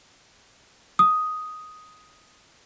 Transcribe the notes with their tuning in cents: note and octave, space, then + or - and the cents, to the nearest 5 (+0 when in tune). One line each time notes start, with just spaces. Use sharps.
D#6 +5